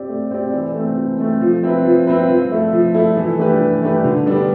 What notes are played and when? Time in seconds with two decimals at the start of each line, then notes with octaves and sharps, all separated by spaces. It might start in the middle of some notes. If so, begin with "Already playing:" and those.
Already playing: C4 G4 D5
0.09 A3
0.31 C4 G4 D5
0.53 E3
0.74 A3
0.80 C4
0.97 E3
1.18 A3 C4
1.41 F3
1.63 C4 E4 B4
1.85 F3
2.07 C4 E4 B4
2.29 F3
2.51 A3 E4 A4
2.73 F3
2.94 A3 E4 A4
3.17 E3
3.38 A3 D4 G4 B4
3.60 E3
3.82 A3 D4 G4 B4
4.04 D3
4.26 G3 B3 D4 A4